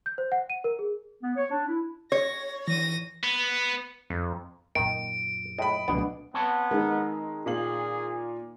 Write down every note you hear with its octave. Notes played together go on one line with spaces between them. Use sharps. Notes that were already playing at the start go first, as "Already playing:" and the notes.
G6
C5
F#5
D#7
A#4
G#4
B3
C#5
D4
E4
C#5 A#6
E3 A#6 D#7
B3
F2
F#2 A#2 D#3 D7
A2 D#5 B5
D1 C#2 B2 B3 D4
B3 C4 C#5 A5
G#3 D#4 A#4
A#2 G#4 F5 F#7